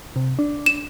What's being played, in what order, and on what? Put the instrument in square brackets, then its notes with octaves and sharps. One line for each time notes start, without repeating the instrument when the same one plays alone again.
[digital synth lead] C3
D4
[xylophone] E7